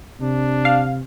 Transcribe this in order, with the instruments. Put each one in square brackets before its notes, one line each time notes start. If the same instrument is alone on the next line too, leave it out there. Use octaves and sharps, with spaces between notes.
[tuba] C3 [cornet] D4
[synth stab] F5